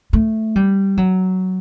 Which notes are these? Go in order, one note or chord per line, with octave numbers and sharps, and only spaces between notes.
A3
G3
F#3